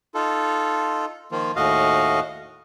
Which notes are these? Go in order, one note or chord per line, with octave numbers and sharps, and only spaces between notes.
D#4 F4 A4
D#3 F3 A#3 F4
D#2 A2 F#4 D#5 F5